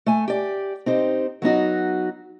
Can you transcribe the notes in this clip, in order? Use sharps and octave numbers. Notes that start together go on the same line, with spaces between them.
A3 G#5
G4 D5
C4 D#4 G4 C5
F#3 B3 D#4 F#4